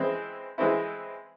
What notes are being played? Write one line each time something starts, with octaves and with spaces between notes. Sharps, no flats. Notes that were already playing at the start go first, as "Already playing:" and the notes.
Already playing: E3 G#3 C4 E4
E3 G#3 C4 E4